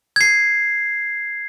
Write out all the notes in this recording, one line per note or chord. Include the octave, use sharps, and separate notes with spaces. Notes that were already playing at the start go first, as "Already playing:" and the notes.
G#6 C7